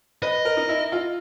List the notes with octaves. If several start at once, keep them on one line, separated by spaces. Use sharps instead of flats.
B4 D#5
A#4
D#4
E4
F4